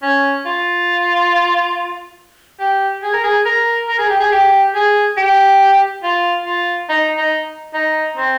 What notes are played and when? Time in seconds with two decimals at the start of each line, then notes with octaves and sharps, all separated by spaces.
0.03 C#4
0.46 F4
2.59 G4
3.03 G#4
3.13 A#4
3.23 G#4
3.45 A#4
3.88 A#4
3.98 G#4
4.09 G4
4.20 G#4
4.32 G4
4.75 G#4
5.17 G4
6.03 F4
6.45 F4
6.89 D#4
7.17 D#4
7.74 D#4
8.17 C4